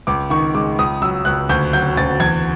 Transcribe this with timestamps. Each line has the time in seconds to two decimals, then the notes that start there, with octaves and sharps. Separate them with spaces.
0.07 C#2 D6
0.30 D#3 C#6
0.54 G#3 D6
0.79 C#2 D#6
1.02 F#3 E6
1.25 C#2 F#6
1.49 D2 G6
1.73 F#3 G6
1.97 D2 A6
2.20 E2 G#6